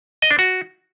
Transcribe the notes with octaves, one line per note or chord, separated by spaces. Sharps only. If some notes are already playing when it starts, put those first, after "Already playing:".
D#5
D4
F#4